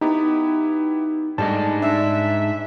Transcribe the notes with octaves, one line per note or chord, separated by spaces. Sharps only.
B3 D#4 E4 G4
G#2 G3 A3 D4 D#4 D#5 A5
D4 E5